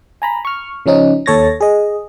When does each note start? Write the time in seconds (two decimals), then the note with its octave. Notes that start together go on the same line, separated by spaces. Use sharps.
0.22 G#5 A#5 B5
0.45 C#6 F6
0.86 C#3 F3 C#4 D#4
1.26 D#2 A4 C#5 A6 A#6
1.61 G#4 D#5